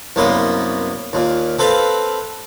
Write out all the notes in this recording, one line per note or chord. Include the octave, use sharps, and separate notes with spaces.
C2 F#2 A#3 B3 C6
D#2 A#2
C4 A4 B4 F5